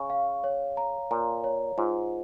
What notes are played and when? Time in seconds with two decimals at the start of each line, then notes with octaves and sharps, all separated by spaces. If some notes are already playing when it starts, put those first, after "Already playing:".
Already playing: C#3 C#6
0.10 F5
0.44 C#5
0.77 A#5
1.11 A#2 A#5
1.44 C#5
1.78 G#2 F4